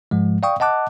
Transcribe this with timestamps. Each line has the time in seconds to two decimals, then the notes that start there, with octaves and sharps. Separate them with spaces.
0.11 G#2 F3 G#3
0.43 D5 F5 G5 C#6 D#6
0.60 D#5 F#5 A5 D6 F#6